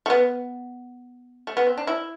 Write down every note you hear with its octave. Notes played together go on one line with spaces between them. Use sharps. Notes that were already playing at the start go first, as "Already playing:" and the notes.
A3
B3
A3
B3
C4
D4
E4